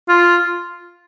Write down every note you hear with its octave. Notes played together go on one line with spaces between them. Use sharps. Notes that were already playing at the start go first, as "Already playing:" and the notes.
F4